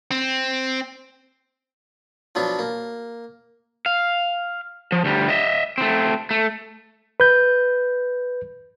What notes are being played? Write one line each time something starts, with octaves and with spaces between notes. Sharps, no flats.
C4
F3 F#3 B3 D4
A#3
F5
F3
D2 G3
D#5 E5
A3 C4
A3
B4 G6